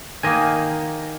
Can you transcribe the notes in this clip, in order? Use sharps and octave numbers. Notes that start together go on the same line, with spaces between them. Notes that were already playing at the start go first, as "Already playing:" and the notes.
D#3 A#3 D#5 G#5